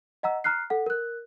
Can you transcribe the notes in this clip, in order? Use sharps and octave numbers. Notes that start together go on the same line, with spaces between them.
D#5 F#5 A#5 E6
A#5 F6 F#6 C7
A4 F#5
A#4 F#6